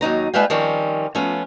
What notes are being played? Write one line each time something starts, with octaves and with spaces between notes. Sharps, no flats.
D#2 F#3 D#4 A#5
G3 G#3 E4 B4 F5 G5
D#3 F3 G3 C4 C#4
F3 A3 B3 C#4 F4